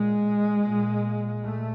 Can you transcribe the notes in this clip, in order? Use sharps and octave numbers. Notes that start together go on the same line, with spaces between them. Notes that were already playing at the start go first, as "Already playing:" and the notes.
Already playing: A#2 G#3
A#2
A#2 A3